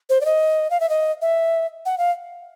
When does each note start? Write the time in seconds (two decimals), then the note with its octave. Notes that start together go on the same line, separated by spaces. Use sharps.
0.10 C5
0.21 D5
0.25 D#5
0.71 F5
0.80 E5
0.89 D#5
1.22 E5
1.86 F#5
1.98 F5